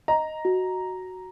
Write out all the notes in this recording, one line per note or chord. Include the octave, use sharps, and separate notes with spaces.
D#5 A#5
F#4